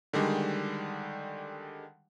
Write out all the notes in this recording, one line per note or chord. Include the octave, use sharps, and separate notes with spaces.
D3 D#3 G3 G#3